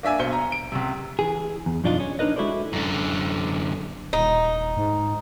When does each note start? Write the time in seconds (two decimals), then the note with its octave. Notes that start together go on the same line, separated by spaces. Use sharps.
0.03 A#3 D4 E5 G#5
0.19 B1 C5 C#7 G7
0.33 A#5
0.52 D7
0.72 C#2 C3
1.19 E3 G#4
1.66 E2
1.84 F#2 B2 F3 D4 D#4 F4
2.00 C#4
2.19 D4 D#4 A#4 B4 D#5
2.36 G#3 E4 F#4 A4 C5 D5
2.73 F#2 D3
4.13 D#1 D#4
4.77 G#2